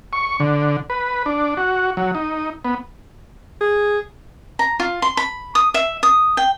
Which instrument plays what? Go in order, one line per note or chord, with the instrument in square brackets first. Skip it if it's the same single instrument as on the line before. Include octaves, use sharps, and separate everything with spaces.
[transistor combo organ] C#6
D3
B4
D4
F#4
F#3
D#4
B3
[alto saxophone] G#4
[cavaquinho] A#5
F4
C6
B5
D#6
E5
D#6
G5